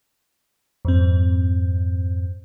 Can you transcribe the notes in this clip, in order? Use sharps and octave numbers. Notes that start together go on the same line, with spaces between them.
F2 G#2 C4